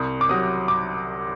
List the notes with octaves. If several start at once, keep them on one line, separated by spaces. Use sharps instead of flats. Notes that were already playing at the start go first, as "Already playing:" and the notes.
Already playing: C2 D#6
D6
C3 F#3 D#6
D6